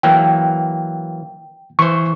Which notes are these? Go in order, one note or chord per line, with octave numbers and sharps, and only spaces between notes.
E3 F#3 A#3 G5
E3 C5 C#6